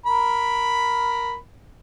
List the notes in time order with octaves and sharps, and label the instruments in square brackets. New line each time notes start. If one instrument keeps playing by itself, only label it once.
[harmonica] A#4 B5